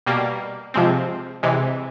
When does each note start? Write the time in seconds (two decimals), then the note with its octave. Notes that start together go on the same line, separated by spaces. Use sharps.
0.06 B2 G3 A#3
0.74 C3 F3 G#3 C4
1.43 C3 E3 G#3